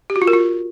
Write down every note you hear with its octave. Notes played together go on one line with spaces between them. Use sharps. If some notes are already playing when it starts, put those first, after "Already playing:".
G4
F#4
F4
A#4
F4